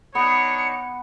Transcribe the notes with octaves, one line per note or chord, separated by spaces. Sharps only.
B3 D4 D#4 C#5 C#7